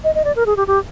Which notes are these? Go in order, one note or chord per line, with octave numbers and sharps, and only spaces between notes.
D#5
D#5
D5
A#4
G#4
G4
G4